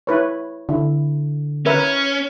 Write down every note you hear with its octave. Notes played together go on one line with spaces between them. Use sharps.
E4 B4 C#5
D3 E4
C#4 A#4 B4 E5